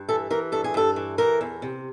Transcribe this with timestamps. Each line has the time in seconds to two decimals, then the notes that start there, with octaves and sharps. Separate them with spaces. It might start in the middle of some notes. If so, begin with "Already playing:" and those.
Already playing: G2
0.09 E3 A4
0.30 E3 A#4
0.52 G2 A4
0.64 G#4
0.74 G2 A4
0.96 E3
1.18 E3 A#4
1.41 E2
1.62 C3